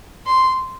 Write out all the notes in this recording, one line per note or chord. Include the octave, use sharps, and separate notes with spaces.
C6